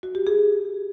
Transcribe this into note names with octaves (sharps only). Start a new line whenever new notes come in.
F#4
G4
G#4